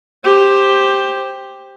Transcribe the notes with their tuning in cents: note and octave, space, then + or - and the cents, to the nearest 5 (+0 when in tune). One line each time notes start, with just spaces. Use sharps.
G4 +5 C5 +10